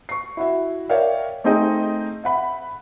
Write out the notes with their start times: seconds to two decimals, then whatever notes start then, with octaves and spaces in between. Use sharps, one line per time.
0.09 C#6 C7
0.37 E4 F#4 E5
0.89 A#4 C#5 D5 E5 F5 G5
1.44 A3 C4 D#4 G#4 D#5 G5
2.24 E5 F#5 B5